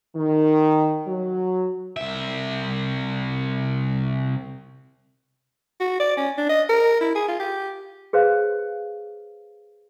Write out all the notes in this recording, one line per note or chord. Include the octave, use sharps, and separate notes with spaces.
D#3
F#3
C2 E5
F#4
D5
C#4
D4
D#5
A#4
E4
G#4
F4
G4
G#4 B4 C5 F5